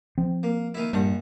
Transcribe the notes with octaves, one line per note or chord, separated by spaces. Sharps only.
F3 C4
A#3
D#3 A#3 E4
A#1 G2 F#5